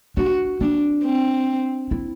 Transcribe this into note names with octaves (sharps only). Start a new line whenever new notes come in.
D4 F#4
C4 D4
C4
E4